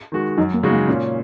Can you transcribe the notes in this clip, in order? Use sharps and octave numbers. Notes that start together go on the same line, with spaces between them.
D#3 G#3 F#4
F#2 D#4
A#3
C#3 G#3 D#4 F#4
A#3
A#2 C#4